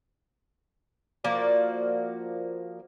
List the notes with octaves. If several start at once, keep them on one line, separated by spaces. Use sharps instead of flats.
F3 A#3 F#4 D5